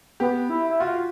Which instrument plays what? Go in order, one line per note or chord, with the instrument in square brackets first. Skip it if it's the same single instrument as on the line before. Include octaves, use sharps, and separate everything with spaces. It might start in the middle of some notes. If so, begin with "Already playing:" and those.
[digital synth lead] B3 [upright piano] G4
[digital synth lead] E4
E4
[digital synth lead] F4 [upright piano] F#4